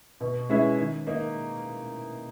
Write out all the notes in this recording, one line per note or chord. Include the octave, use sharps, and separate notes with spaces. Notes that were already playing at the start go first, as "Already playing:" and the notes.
B2
G#3 C#4 E4
D#3
A#3 D#4